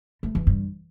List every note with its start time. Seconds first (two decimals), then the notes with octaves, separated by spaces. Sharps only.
0.23 A3
0.35 E3
0.47 G2